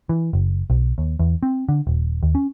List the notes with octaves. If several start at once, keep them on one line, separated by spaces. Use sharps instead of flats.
E3
F#1
B1
D#2
E2
C4
D3
D#1
D#2
C#4